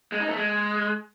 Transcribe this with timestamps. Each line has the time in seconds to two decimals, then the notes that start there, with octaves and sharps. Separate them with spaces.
0.12 G#3
0.20 D#4
0.28 A3
0.36 G#3